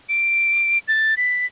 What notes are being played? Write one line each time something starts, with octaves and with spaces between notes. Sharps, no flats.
D7
A6
B6